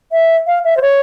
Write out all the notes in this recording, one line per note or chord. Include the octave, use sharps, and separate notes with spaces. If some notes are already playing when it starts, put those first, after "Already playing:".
E5
F5
E5
C5
C#5